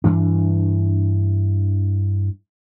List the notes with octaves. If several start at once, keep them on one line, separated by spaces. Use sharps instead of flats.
G2 E3 D4